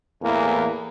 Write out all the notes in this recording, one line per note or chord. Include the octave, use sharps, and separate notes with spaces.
E2 A2 E3 A#3